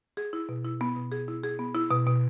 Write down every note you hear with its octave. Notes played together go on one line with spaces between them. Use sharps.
G#4
E4
B2
E4
B3
B2
G#4
E4
G#4
B3
E4
B2
B2